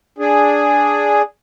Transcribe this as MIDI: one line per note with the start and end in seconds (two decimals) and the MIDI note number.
0.18 1.22 62
0.18 1.22 68